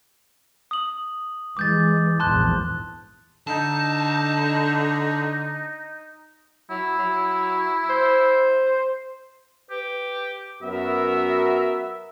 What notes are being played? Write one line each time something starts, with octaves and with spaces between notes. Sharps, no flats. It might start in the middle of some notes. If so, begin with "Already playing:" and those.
D#6 F#7
E3 G#3 D6 G6 A6
A#1 E2 G#2 A5 C6 F#6
D3 D#4 A5
F#3 E4
F#3
C5
G4 B4
F#2 B3 F#4 A#4 E5